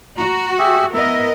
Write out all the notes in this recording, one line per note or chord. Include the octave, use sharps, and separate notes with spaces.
F#4 A#5
G4 G#4 E5
B3 E4 A#4 D#5 E5